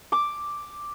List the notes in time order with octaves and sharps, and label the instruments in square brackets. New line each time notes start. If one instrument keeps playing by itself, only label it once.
[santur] D6